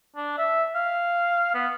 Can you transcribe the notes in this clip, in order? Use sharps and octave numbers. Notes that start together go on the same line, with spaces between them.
D4
E5
F5
B3